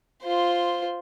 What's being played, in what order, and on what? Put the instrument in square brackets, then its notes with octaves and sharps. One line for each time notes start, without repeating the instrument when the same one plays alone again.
[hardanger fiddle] F4 C5